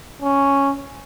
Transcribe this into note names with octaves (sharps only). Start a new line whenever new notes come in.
C#4